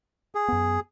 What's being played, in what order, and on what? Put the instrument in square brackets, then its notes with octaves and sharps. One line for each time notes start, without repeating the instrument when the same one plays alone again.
[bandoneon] G#4
[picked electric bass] F#2 B3